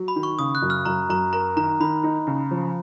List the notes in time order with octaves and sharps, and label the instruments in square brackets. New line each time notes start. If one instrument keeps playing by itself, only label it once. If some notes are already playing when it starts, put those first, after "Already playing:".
Already playing: [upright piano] F#3
[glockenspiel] B5
[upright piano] D#3
[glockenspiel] C#6
[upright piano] C#3 [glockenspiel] D#6
[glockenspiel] F#6
[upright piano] F#2
[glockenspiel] F6
[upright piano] F#2 [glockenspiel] A#5
[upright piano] F#2 [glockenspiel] A#5
[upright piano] A#4 [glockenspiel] A#5
[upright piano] D#3 [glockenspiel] A#5
[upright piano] D#3 [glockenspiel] B5
[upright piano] D#4
C#3
F3